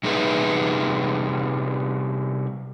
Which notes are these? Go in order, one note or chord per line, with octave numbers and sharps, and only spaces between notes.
C3 G3 D#4 G#4 B4 E5